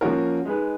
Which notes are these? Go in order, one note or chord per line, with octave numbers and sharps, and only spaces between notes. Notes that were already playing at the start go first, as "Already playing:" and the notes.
F3 A#3 C#4 F#4 A#4
G#3 D#4 G#4 B4